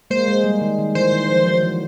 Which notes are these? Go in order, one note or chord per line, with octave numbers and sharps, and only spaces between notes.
G#3 A#3 C5
G#3
G3
D#3
D#3
E3 C5
D#3
F3
F#3
E3